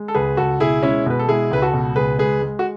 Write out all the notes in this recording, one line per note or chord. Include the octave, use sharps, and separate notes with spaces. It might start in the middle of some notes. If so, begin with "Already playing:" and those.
Already playing: G#3
A4
C#2 G#4 B4
C#2 F#4 A4
B2 E4 G#4
G#3 C#4 E4
B2 B4
A4
G#3 E4 G#4
C#2 B4
F#4 A4
B2
C#2 G#4 B4
G#3 G#4 B4
G#3
F#4